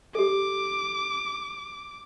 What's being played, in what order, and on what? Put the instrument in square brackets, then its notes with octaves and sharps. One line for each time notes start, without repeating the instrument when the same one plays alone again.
[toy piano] G4 A4 [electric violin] D6